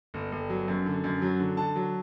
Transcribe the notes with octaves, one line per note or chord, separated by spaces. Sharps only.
G1
G1
F#3
F#2
D3
F#2
F#3
D3
D3 A5
F#3